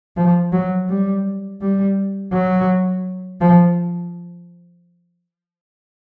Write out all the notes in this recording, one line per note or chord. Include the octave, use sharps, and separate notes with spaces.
F3
F#3
G3
G3
F#3
F3